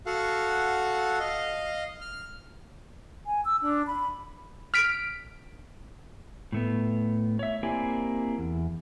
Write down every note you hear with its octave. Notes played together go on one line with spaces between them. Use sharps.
F#4 A4 F5 F#5
D#5 F5
F6
G#5
E6
D4
B5
F6 B6 D7
A2 A3 B3
C#5 E5
A#3 C4 E4 G4 D5 G#5
E2